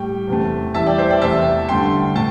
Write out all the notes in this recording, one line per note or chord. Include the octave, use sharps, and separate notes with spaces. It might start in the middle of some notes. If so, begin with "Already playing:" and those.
Already playing: A2 G3 G5
E2 C3 A3
E2 E3 G3 E5 A5
D5 G5
C5 E5
D5 G5
E2 C3 A3 E5 A5
G2 D3 A3 G5 C6
A2 A3 A5